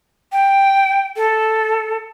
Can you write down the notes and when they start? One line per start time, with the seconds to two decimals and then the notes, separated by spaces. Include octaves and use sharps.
0.32 G5
1.17 A4